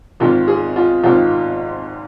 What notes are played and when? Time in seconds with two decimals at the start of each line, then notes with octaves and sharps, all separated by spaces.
0.20 G#1 G#2 D#3 F4
0.48 G#4
0.76 F4
1.03 G#1 G#2 D#3 F4